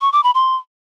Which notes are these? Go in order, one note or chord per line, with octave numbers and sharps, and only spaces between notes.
C#6
D6
B5
C6